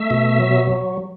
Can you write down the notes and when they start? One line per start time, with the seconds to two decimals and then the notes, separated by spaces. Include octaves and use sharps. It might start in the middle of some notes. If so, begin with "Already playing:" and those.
Already playing: A3 E5
0.10 B2
0.40 F#3